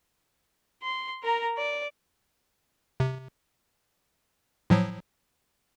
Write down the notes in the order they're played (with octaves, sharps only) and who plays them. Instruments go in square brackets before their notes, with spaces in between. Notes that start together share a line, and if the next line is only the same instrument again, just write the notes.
[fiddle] C6
A#4 A#5
D5
[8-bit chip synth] C3
A2 F3 F#3